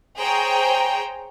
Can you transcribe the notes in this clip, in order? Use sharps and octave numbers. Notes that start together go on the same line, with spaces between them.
G#4 C5 C#5 G5 A#5